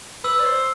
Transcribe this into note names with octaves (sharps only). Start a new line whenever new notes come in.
B4 E6
D5
C5